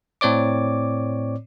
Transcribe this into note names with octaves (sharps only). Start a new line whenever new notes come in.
A2 C4 C#5 D5 D6